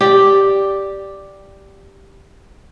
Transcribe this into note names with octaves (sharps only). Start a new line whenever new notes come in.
G4 D5